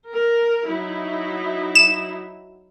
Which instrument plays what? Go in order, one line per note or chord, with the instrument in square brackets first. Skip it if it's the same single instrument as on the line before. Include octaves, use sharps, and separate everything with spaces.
[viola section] A#4
F#3 D#4 E4
[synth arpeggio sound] E7